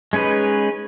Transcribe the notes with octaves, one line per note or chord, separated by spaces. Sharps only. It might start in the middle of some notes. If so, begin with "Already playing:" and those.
G#3 C#4 D#4 B4